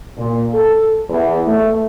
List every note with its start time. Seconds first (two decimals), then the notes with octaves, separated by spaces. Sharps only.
0.17 A#2
0.53 A4
1.09 E2
1.47 A3